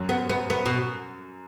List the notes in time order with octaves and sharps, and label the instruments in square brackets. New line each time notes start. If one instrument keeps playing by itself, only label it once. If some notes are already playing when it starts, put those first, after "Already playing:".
Already playing: [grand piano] F#2 F#3
[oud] B3
B3
B3
B2